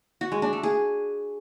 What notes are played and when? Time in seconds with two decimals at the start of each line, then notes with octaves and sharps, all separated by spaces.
0.21 F#4
0.32 G#3
0.42 D4
0.53 A3
0.63 G#4